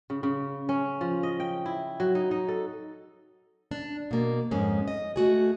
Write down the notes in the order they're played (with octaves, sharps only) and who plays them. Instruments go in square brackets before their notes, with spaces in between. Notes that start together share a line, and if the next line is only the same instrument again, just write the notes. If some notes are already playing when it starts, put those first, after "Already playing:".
[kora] C#3
C#3
C#4
F3
D#5
G5
E4
F#3
D#4
D#4
A4
[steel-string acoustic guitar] D4
B2 A#3
F2 G#2 G#3 C#4
D#5
A3 F#4 G#4